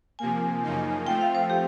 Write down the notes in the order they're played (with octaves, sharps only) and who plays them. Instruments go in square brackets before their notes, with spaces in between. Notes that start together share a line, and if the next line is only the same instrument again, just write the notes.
[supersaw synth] C3 F3 A#3 [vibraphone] G#5
[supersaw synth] F#2 C#3 F3 A#3 D#4
[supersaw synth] F3 A3 C4 F4 [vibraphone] G5
[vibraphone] F5
C5
G4